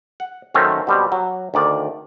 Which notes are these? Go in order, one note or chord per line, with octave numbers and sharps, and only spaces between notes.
F#5
D#3 F#3 A3 C4 C#4
B2 G3 C4
F#3
D2 D#3 D5